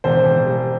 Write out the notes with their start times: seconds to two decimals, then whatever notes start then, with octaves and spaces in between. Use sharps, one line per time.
0.04 E1 C5
0.26 E1
0.46 G3